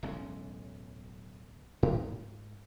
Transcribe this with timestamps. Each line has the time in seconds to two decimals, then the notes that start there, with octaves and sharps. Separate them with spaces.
0.03 D1 B1 G#3 C#4
1.83 G#2